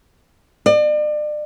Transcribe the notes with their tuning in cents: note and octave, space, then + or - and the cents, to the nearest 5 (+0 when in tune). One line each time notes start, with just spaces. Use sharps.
D5 +40